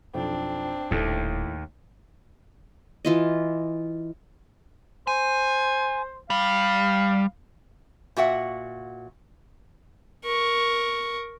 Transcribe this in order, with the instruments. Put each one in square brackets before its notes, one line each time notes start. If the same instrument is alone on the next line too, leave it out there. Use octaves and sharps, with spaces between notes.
[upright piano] B1 F2 [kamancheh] C4 D4
[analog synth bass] D#1 [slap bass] D#2 [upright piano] A2 A3
[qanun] E3 F4 D#5
[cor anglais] C5 [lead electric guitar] G#5
[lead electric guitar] G3 [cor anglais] F5
[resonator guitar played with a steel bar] A#2 F#4 E5 F#5
[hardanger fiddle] A#4 C#6